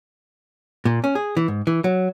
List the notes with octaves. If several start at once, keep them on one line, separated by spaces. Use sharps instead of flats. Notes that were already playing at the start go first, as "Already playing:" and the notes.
A#2
C#4
G#4
E3
G#2
E3
F#3